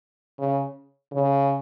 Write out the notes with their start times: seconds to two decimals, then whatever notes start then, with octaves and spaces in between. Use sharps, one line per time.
0.39 C#3
1.12 C#3